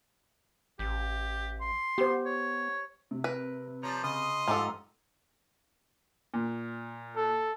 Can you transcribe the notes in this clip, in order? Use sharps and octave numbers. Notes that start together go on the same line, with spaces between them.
A1 G4
C6
B3 G4 C5
C#5
C3
A#4 B4
F3 G3 C#5 A#5
C#3 D#5 C6 D#6
G#2 F3 G4 A4 A#5 E6
A#2
A4